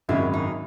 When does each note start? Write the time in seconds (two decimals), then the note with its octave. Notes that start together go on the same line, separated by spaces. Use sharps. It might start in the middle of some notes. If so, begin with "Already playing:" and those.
0.09 G#1 F#2 C#3 G#3 E4
0.34 D#4